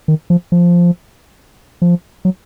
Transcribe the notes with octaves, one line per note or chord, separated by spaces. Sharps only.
D#3
F3
F3
F3
F#3